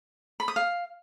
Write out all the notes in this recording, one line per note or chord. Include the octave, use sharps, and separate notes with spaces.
B5
D#6
F5